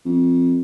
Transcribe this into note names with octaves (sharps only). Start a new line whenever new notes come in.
F2